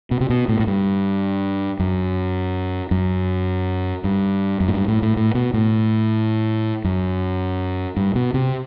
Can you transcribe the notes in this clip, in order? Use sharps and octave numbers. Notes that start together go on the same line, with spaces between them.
B2
C3
B2
A2
A2
G2
F#2
F#2
G2
F#2
A2
G2
A2
A2
A2
B2
A2
F#2
G2
B2
C3